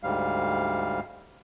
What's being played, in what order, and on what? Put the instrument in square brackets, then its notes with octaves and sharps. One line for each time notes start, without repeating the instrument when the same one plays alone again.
[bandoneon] D2 G#2 G3 F5